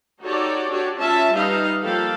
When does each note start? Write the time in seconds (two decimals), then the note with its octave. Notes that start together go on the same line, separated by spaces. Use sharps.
0.21 D#4 F#4 G4 A4 C#5 D5
0.70 D4 F#4 G4 C#5 D5
0.98 C#4 F4 E5 A5
1.35 G3 D#4 B4 D#5 F5
1.84 F3 A#3 A4 F5 G5 B5